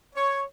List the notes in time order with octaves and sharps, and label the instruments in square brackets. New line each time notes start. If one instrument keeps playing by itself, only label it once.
[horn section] C#5